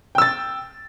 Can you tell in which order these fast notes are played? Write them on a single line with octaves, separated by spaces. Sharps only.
G5 E6 A6